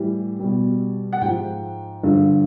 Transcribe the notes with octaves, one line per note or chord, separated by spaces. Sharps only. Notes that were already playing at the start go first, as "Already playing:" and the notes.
Already playing: A2 E3 G3
B2 G3
F#5
G#2 F3 G5
G2 D3 F3